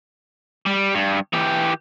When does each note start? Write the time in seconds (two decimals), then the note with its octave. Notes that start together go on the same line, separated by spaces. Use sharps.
0.66 G3
0.95 G2
1.33 E3 G4